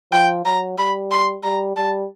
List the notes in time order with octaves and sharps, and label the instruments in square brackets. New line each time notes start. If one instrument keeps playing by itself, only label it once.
[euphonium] F3 [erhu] G5
[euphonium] F#3 [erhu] A#5
[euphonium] G3 [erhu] B5
[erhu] C6
[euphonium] G3 [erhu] A#5
[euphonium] G3 [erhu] A5